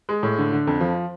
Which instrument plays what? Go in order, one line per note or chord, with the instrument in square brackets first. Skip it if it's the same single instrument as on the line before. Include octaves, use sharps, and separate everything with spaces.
[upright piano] G#3
A2
D3
D3
F2
F3